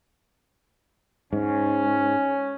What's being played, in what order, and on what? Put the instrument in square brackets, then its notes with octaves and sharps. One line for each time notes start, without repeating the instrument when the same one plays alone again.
[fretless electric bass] G#2 [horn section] C#4